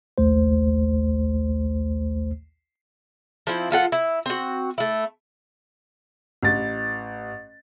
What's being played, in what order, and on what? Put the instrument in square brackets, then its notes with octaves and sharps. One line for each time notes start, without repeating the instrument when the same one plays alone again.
[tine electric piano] A#1 D#2 A3 C5
[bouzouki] F3 C4 E4
F3 F4 A4 F#5
E4
C4 F#4
A3 E4
[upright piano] A1 A6